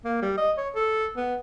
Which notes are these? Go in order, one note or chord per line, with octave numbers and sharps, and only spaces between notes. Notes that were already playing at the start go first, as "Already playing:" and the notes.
A#3
G3
D#5
C#5
A4
B3